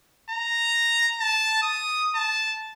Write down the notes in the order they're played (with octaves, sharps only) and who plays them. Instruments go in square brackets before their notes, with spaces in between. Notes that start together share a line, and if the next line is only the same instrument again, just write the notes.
[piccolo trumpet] A#5
A5
D#6
A5